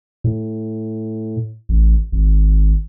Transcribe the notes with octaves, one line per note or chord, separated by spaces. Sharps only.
A2
A1
G#1